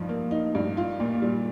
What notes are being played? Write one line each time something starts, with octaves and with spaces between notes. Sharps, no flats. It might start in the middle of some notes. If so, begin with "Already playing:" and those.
Already playing: G2 F3 D#4
A#3
D#4
G2
F4
A#2
G3